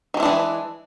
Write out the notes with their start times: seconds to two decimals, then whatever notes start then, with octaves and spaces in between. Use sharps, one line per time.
0.14 D#3
0.17 G#3
0.20 E4
0.23 D4
0.25 E3